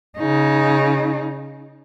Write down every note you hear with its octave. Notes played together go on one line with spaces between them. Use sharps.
C#3 D#4